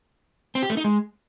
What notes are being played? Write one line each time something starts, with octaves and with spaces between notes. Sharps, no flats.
C4
G4
A3
D#4
G#3